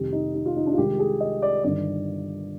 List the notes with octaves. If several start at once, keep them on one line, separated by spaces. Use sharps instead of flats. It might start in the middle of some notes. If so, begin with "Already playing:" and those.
Already playing: F1 F2 D#3 G3 G4
D#4
D#4
F4
D#4
D4
F4
C2 C3 D#3 G#3 G4
G#4
D#5
D5
G1 G2 D#3 D5